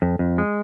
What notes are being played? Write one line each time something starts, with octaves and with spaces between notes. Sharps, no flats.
F2
F2
G#3